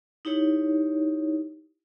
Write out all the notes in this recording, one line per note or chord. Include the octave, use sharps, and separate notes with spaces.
D#4 E4 G4 C#5